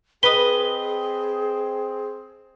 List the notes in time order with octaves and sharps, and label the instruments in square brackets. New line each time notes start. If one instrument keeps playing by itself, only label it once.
[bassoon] C4 [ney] G#4 [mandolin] B4 D#5 [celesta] G7